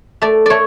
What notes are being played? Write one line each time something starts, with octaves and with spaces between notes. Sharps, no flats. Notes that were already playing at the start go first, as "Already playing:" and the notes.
A3 D5
A3 C#5 D5